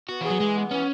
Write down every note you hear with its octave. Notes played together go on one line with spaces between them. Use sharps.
B3 F#4
E3 G#4
F#3
E3 G#3
B3
E3 C#4